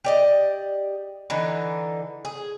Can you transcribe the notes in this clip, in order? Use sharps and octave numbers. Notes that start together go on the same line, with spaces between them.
G4 D5 D#5
D3 E3 D#4
G#4